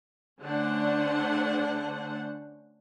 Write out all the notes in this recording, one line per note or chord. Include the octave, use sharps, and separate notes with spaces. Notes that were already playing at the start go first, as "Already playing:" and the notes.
D3 A3 C#4 D4 C5 F#5